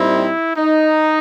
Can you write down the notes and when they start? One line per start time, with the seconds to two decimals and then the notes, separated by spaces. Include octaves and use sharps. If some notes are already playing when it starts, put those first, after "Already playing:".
Already playing: A#2 G3 C4 D#4 E4
0.56 D#4